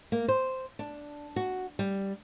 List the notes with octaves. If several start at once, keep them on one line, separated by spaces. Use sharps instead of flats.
A#3
C5
D4
F#4
G3